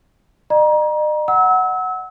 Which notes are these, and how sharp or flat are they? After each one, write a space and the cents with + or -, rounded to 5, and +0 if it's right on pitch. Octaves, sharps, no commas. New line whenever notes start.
D#5 -45 A#5 +30
F#5 +0 E6 -30